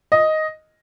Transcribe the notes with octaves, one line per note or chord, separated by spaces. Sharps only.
D#5